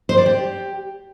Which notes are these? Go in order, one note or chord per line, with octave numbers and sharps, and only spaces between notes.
C5
D5
G4